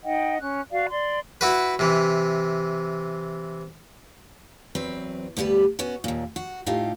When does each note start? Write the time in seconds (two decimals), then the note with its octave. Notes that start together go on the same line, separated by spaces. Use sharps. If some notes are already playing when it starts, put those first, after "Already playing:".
0.04 D#4 D#5 F#5 G5
0.40 C#4 F#6
0.70 F#4 D5 F5
0.89 D5 C6
1.41 E4 F#4 B4
1.79 C3 E3
4.75 E2 F#3 C4 B4
5.37 D2 G2 G3 B3 B4
5.79 B3 C#4 F#4
6.04 D#2 A#2
6.36 F#4
6.66 A2 D#4 F4 G4